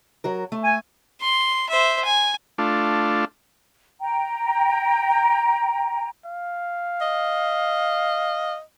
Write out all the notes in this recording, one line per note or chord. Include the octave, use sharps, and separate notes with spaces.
F#3 F#4 A#4
A3
G#5
C6
C5 E5
G#5
A3 D4 F4
G5 A#5
F5
D#5